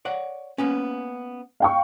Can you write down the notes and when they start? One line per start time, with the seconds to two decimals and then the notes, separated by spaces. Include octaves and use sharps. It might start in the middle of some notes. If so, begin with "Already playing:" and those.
0.05 C#5 D5 F#5
0.58 A#3 B3 C#4
1.60 F5 G5 C#6